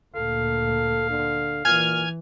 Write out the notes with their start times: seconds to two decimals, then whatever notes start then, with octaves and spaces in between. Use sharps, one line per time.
0.15 D2 A#2 A4 F5
1.10 D3
1.65 A#2 E3 G#5 F6 G#6